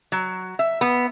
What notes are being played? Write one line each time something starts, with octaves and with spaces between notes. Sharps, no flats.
F#3
E5
B3